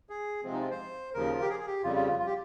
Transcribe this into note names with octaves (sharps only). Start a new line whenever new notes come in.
G#4
C3 F3 G#3 C4
D#4
F4
C5
D#2 C#3 F3 A#4
F4
G4
G#4
G#4
G4
F2 C#3 G3 F4
F4
F4
F4
G4